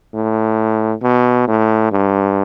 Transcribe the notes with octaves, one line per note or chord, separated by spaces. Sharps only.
A2
B2
A2
G2